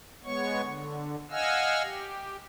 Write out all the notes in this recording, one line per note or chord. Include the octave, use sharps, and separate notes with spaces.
G#3 B3 C#5 C#6
D3
D#5 F5 F#5 G#5 E6 F6
G4